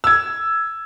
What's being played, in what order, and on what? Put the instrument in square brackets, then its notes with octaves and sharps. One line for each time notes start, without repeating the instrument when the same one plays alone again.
[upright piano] E6 G#6